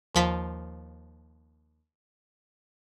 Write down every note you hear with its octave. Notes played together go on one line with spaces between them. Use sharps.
D#2 F3 B6